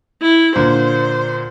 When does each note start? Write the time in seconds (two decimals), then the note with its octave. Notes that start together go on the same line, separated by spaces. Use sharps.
0.22 E4
0.56 A#2 D3 C5